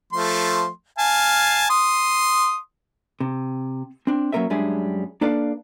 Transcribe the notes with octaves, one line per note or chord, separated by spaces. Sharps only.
F3 A3 C6
F5 G#5 A5
C6 D#6
C3
C4 D4
F#3 A#3 C#4 A#4 B4 E5
F#2 G3 G#3 D4 G#4 E5
A#3 D4 A4 B4 D5 F5